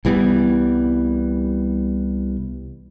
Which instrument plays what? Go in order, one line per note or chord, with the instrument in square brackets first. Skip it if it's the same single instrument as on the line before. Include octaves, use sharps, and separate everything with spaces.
[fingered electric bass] C2 E3 G3 B3